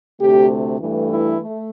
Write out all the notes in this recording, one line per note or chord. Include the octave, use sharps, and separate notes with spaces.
D2 C3 A3 G4
G2 E3 A3
E4
A3